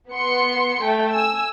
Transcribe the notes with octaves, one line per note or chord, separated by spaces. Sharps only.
B3 C6 C#7
A3 G5
G#5 E6